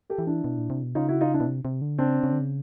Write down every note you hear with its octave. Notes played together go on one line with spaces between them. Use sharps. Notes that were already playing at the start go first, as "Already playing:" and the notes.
G4 A4
E3
D4 E4
B2
A#2
C3
B2
C#3 D#4 F4
E4 F#4
D#4 F4
D4 E4
B2
C3
C3
D3
C#3 C4 D4
C#3
D3
C#3